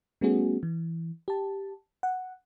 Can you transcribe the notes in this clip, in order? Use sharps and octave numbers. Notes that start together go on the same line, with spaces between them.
G3 A3 B3 C#4 F#4 G#4
E3
G4 A5
F#5